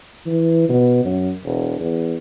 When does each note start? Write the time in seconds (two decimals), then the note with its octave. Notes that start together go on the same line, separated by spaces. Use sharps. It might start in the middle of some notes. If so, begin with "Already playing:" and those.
0.26 E3
0.69 B2
1.05 F#2
1.44 E1
1.79 E2